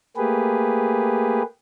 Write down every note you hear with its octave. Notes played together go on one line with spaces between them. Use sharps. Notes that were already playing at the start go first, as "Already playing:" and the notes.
A3 A#3 G4 G#4 B4